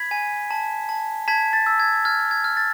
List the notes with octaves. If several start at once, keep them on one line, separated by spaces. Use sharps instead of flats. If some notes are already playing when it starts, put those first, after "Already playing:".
Already playing: B5 G#6 B6
G#5
A5
A5
A5 G#6 B6
A6
E6
G#6
F6 G#6
G#6
F6
A6